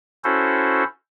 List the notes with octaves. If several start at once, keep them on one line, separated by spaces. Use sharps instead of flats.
C#4 E4 F#4 A4 C5